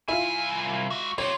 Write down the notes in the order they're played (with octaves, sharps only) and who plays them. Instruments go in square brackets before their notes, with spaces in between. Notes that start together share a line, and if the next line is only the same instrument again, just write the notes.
[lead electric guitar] C2 G#5 [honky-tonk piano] E4 F4
[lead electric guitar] G#3 F#4
[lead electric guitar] F4 G4 [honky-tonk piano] C#5